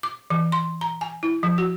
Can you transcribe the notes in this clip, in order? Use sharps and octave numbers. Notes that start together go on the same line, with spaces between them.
D6
E3
C6
A#5
G#5
E4
F3
F#4